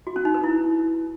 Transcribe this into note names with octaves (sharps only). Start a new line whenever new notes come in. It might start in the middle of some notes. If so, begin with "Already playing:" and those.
F#4
C#4
D#4
B4
E4